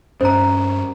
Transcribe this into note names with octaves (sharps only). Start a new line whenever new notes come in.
G2 C#4 C5 A#5